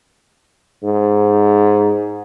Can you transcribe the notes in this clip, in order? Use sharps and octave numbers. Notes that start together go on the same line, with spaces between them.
G#2